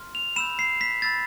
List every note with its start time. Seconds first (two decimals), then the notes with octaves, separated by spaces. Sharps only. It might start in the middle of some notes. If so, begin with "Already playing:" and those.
Already playing: C6 F6
0.15 F7
0.36 B5 E6 G6 E7
0.59 C7
0.81 B6
1.02 B5 E6 G6 A6